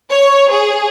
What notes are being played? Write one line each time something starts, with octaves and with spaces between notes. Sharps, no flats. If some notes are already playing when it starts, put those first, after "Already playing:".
C#5
G#4